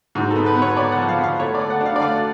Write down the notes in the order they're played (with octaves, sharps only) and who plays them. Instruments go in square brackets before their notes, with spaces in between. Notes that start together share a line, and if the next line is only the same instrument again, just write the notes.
[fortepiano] G#2 F#4
A4
B3
B4
B3
C#5
B3 D5
F#5
F3
F5
B3
F5
A3 C#5
D5
A3
F#5
D4 F5
D5
A3 F5